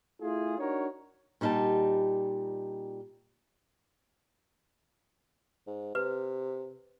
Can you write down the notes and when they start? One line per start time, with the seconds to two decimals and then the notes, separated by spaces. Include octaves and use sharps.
0.21 A3 E4 F4 G#4
0.58 D4 D#4 F#4 A#4 C#5
1.41 A#2 G3 D#4 G4 A5
5.67 G#2
5.95 C3 B4